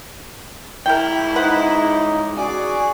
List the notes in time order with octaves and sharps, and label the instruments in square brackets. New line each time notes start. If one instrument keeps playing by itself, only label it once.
[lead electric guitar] C#2 A#5 [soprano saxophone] E4 [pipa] A#4 G5
[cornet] D#4 [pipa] B4 C5 F#5
[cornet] F#4 [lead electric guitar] G#4 G#5 [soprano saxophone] D5